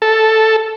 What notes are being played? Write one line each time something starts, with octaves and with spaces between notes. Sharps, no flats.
A4